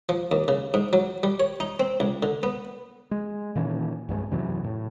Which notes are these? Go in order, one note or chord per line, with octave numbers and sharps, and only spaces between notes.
F3
D#2
C#3
G#2
F#3
G3
C#5
D#4
C4
C#2
D3
B3
G#3
A#2 D#3 E3 C#4
C2 G2 F#3 G#3
F#2 C3 E3 F#3
A2